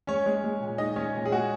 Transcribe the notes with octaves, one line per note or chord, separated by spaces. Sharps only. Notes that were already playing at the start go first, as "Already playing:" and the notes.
G#3 C#4 C#5
G#3
G#3
A#2
G#3 D#4 D#5
G#3 C#4 C#5
A#2
G#4
G#3 F#4